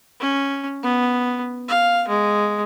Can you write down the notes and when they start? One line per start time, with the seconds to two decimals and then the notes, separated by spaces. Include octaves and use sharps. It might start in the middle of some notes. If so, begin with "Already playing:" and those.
0.20 C#4
0.83 B3
1.68 F5
2.08 G#3